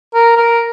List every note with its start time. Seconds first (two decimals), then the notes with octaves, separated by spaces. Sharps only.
0.14 A#4
0.37 A#4